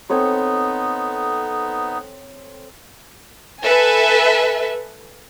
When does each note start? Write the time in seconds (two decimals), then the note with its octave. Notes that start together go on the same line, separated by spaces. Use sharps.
0.10 B3 C4 D#4 A4 C#5
3.62 A4 B4 E5 G#5